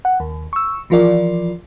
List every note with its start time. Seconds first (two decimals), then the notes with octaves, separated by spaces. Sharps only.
0.05 F#5
0.20 D#2
0.53 C#6 E6
0.90 E3 F3 F4 A#4 D5